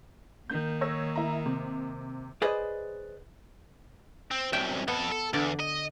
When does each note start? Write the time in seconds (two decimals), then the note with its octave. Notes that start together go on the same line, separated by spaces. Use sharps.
0.50 D#3 A#3 G6
0.81 C#5 E6 A#6
1.16 E4 A#5
1.46 C3
2.42 G#4 B4 C5 D5 D#5
4.31 C4
4.53 C2 F#2 E5 G5
4.88 F2 B3 A4
5.12 A4
5.33 E2 D3 D5
5.60 D#5